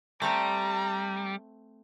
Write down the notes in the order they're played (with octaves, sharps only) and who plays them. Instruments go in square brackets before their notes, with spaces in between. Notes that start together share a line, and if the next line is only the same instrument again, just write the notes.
[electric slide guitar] G3 [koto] A3 C4 A4 [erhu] A#5